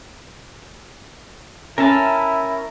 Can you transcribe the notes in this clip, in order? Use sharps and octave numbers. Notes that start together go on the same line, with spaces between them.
C#4 E4 A#4 E5 A5